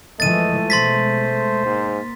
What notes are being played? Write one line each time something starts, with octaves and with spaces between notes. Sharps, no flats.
E3 F3 G#3 A3 D#5 A6 D#7
B2 G#3 C5 C6 A6 B6
G#2 A#3